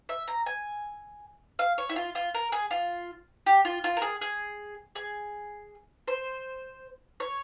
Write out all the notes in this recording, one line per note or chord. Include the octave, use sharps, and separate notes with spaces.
E5
A#5
G#5
F5
C#5
E4
F4
F4
A#4
G#4
F4
G4
F4
F4
A#4
G#4
G#4
G#4
C5
C#5